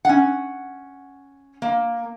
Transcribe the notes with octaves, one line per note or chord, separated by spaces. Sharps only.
C#4 F#5
A#3